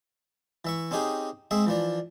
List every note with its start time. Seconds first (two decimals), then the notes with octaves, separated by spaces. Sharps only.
0.65 E3 E5 C#6
0.91 C4 C#4 D#4 G4 G#4
1.51 G#3 C4 G#4 E5
1.66 E3 F3 D4